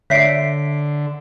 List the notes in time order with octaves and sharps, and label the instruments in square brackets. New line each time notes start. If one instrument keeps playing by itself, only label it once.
[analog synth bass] D3 [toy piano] C#5 D5 E5 [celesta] B6 C7 D7